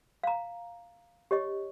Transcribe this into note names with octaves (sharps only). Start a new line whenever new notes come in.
F5 A#5
G4 C#5 D#5 C#6